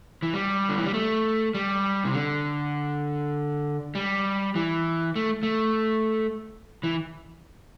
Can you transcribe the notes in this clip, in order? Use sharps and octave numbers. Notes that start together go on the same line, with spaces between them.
E3
G3
D3
E3
G3
A3
G3
C3
D3
G3
E3
A3
A3
E3